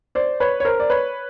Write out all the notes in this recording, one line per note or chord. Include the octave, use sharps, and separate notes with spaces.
C5 D5
B4 C#5
C#5
A#4 C5
D5
B4 C#5